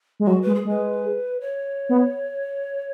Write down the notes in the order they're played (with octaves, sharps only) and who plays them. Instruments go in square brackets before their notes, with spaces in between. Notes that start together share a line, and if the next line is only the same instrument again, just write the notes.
[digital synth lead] G#3
[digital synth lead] F#3 [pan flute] F#4
[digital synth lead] G#3 [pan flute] B4
[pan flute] G#4
[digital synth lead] G#3 [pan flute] B4
[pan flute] C#5
[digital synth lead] B3